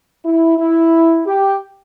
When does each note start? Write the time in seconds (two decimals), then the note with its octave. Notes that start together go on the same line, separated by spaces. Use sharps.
0.25 E4
0.59 E4
1.27 G4